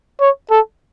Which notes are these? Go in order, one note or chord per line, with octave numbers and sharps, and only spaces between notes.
C#5
A4